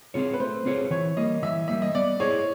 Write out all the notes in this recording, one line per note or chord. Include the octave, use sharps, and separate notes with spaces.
C4 F4 G#4 C#5
B4
A3 C5
C4 F4 G#4 C#5
E3 C#5
G3 A#3 D#5
E3 E5
G3 A#3 E5
D#5
B3 D5
E4 G#4 C5 C#5 D#5